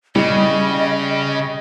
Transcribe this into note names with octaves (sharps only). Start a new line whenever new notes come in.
C#3 G3 D#5